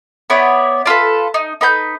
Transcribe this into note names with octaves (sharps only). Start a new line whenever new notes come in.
B3 E4 C#5 D5
D4 F4 A4 B4
D#4
D#4 B4 A#5 G6